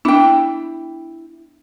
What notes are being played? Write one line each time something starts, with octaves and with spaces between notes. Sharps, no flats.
B3 D4 E4 G5